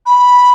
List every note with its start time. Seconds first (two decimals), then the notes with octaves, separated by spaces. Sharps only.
0.05 B5